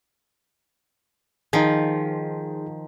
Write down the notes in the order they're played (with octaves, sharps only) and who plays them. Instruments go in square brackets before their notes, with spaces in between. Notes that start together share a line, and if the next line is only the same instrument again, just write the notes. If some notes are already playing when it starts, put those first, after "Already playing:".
[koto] D#3 F3 [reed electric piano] D#4 G#4